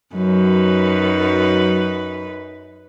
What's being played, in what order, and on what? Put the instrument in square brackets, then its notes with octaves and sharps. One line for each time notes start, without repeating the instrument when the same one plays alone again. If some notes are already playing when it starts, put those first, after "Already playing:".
[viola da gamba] F#2 D#4 B4 [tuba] F#3